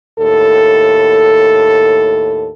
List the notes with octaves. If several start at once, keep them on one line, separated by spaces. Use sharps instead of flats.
D#2 A2 A4